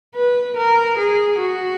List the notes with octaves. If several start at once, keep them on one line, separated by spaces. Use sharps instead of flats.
B4
A#4
G#4
F#4